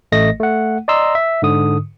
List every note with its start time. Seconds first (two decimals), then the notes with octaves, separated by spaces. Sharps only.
0.12 A1 A3 D#5 A#6
0.40 A3 F#5
0.88 D5 D#5 A#5 C6 E6
1.15 E5
1.42 G#2 D3 D#6